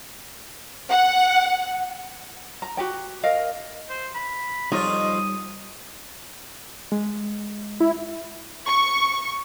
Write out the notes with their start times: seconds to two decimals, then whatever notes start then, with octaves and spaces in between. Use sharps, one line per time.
0.90 F#5
2.62 A#5
2.77 F#4 G4 G5
3.23 A#4 D#5 F5
3.89 C5
4.14 B5
4.72 F2 G3 D#4 F4 C#5 D#6
6.92 G#3
7.80 E4
8.67 C#6